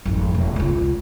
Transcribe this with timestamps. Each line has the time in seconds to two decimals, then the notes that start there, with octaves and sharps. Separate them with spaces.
0.05 G#1 F2
0.35 E1
0.56 C#2 F4